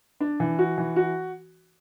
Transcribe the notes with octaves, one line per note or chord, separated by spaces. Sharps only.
D4
E3
F#4
E3
F#4